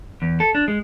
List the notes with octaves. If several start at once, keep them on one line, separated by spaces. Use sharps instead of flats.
E2
A4
D4
G#3